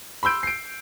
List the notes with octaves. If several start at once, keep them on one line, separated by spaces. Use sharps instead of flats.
B5 C6 E6 G6 D7
C7 D7